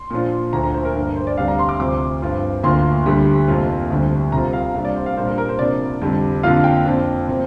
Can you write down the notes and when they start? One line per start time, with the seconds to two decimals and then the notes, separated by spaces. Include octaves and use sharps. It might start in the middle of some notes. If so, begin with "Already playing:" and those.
Already playing: C6
0.10 A#2 F3 D4 F4
0.53 D2 D3 F3 A#3 A#5
0.63 A#5
0.74 C5
0.85 A#4
0.95 G2 F3 D4
1.16 C5
1.27 D5
1.37 D2 C3 G3 D4 F5
1.48 A#5
1.59 C6
1.69 D6
1.80 D2 C3 F3 D6
2.22 G2 F3 C4 F4
2.64 D2 D3 A#3 F4 C6
3.06 D2 D3 G3
3.48 F2 C3 A#3 F4
3.90 D2 D3 G3 C4
4.32 C2 C3 G3 C4 F4 A#5
4.53 F5
4.75 C3 G3 A#3 D4 F5
4.85 D5
4.96 C5
5.06 F5
5.17 A#2 G3 A#3 D4 C5
5.27 A#4
5.38 A#4
5.49 C5
5.58 C2 C3 F3 D4 D5
6.02 F2 D3 G3
6.43 F2 D3 A#3 F4 F5
6.64 G5
6.86 F2 F3 D4
7.27 C3 F3 A#3